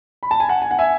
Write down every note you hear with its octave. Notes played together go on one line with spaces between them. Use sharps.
B5
A5
G#5
F#5 A5
G#5
F#5
E5 G#5